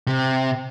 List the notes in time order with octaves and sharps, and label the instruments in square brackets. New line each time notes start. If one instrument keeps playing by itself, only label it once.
[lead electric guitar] C3